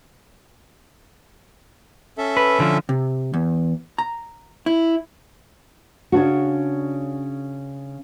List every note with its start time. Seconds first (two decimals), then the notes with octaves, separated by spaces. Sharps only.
2.18 C#4 A4 E5
2.37 B4
2.60 D3 F3
2.89 C3
3.34 E2
3.98 A#5
4.66 E4
6.12 C#3 C#4 D4 F#4